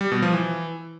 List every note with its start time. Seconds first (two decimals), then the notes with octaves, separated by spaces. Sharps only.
0.01 G3
0.12 B2
0.22 F3
0.33 E3